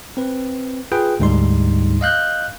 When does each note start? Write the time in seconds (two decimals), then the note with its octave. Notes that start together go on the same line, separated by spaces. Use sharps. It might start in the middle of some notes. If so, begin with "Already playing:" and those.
0.17 C4 B4
0.92 F4 G#4 B4 G5
1.20 D2 G#2 G3 D#4 C6
2.01 D#5 F5 F#6 G6